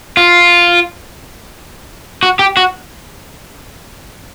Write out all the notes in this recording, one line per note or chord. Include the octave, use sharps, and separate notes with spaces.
F4
F#4
G4
F#4